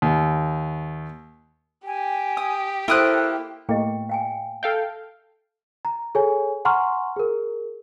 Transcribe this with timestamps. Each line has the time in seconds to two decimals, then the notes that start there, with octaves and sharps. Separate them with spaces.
0.02 D#2
1.87 G4 G#5
2.37 D#6
2.88 A#3 E4 A4 C5 D#6 F#6
3.69 A2 A#3 G4 D#5 G5
4.09 F5 G5 G#5
4.63 A4 E5 F5 G5
5.85 A#5
6.15 G#4 A4 C#5 G#5
6.65 F#5 G#5 A#5 C6 C#6 F6
7.16 G#4 A#4